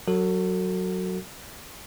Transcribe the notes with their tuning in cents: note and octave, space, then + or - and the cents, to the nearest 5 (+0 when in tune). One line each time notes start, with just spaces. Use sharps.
F#3 +0 F#4 +0 A4 +40